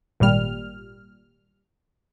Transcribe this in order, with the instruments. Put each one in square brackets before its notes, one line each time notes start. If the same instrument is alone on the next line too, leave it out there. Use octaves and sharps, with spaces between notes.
[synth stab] G#1 A#2 G3 F6